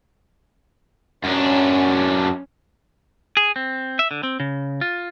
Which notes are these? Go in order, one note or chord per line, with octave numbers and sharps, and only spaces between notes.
F#2 C#4 D4
G#4
C4
E5
D3
C4
C#3
F4